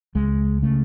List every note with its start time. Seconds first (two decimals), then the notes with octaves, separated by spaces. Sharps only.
0.15 C#2 G#3
0.63 C#3 A3